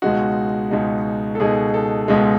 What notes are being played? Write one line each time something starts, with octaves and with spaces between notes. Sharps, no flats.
C#2 B2 G#3 D#4 F#4
C#2 B2 G#3 D#4
A4
C#2 B2 G#3 D#4 G#4
A4
C#2 B2 G#3 D#4